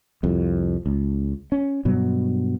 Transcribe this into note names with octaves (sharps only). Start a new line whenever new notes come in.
C2 F2
C#2
C#4
G2 B2 F#3